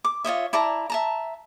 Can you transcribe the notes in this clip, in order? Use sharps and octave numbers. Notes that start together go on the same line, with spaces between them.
D6
F4 C#5 D#5 E5
E4 D5 A5 A#5
E5 A5 A#5